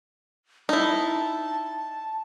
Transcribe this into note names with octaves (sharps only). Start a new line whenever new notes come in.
D#4 E4 A5